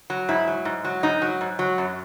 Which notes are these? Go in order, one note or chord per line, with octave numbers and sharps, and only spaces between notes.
F#3
G#2 E4
F#3
G#2
F#3
G#2 D#4
F#3
G#2
F#3
F#2